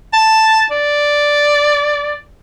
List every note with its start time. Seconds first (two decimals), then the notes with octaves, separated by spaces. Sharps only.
0.14 A5
0.71 D5